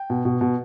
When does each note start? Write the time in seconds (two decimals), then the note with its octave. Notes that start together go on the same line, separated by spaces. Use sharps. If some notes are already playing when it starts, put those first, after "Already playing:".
Already playing: G5
0.10 B2
0.25 B2
0.41 B2